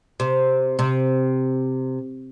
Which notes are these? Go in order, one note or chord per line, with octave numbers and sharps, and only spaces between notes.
C3
C3